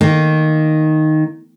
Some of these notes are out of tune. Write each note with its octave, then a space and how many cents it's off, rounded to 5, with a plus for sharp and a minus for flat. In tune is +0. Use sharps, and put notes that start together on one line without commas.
D#3 +0 A#3 +0